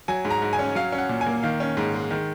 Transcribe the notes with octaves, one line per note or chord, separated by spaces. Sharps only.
F#3 G#5
G#2
A#5
G#2
G#5
C#4
F#3 F5
C#4
F#5
A#2
G#5
A#3
D#3 F5
C#4
G#2
G#3
D#3